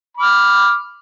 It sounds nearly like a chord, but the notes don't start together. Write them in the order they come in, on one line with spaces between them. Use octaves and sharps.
B5 D6 F6